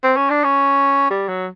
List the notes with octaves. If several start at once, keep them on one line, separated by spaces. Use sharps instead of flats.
C4
C#4
D4
C#4
G3
F#3